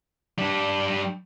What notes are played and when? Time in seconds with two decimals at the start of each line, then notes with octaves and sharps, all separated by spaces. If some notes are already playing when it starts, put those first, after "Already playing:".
0.39 G3 D4